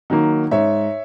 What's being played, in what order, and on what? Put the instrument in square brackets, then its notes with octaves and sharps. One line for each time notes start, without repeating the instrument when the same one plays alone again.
[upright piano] D#3 F#3 A#3
G#2 C#5 E5